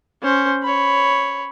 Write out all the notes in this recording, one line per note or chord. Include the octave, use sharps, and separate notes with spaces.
C#4 C5
C#5 B5